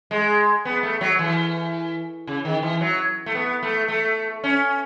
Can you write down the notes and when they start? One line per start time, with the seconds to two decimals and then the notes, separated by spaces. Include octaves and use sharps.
0.11 G#3
0.65 B3
0.83 A3
1.01 F#3
1.19 E3
2.27 C#3
2.45 D#3
2.63 E3
2.81 F#3
3.26 A3
3.35 B3
3.63 A3
3.88 A3
4.43 C#4